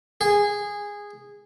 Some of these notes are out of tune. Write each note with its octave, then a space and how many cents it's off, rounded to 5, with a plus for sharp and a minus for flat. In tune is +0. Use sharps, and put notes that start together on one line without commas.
G#4 -15